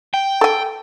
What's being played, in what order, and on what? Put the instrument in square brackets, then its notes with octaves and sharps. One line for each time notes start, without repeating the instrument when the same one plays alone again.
[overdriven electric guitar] G5
[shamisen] A4 G#5